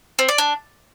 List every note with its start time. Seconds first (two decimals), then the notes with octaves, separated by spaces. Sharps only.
0.19 C4
0.29 D5
0.38 D4